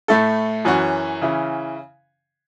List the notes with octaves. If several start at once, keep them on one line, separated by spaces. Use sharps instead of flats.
A2 A3 E4 A4
F#2 E3 C#4 F#4
C#3 E3 C#4 E4